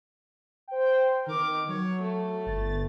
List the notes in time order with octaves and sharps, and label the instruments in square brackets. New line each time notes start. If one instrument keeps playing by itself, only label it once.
[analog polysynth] C5 G5
[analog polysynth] D#3 [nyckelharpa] A#4 D6
[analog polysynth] F#3 [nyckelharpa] C#5
[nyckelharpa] A3
[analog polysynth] G1 A6